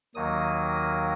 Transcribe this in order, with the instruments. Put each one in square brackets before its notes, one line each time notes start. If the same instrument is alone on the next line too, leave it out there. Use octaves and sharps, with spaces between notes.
[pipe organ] D#2 D#3 F#3 A#3 D#6